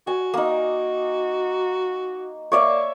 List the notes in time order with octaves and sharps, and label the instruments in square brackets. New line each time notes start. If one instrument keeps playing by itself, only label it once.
[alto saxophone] F#4 [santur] G#5
[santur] A#3 D#4
[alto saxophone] A#3 [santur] C#5 D5 E5